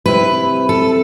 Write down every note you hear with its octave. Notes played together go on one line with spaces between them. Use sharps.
C3 G3 C4 E4 B4
A4